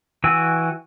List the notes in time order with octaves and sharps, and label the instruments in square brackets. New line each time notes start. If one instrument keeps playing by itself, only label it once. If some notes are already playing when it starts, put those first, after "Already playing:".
[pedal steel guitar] E3 F#4 G5 G#5 E6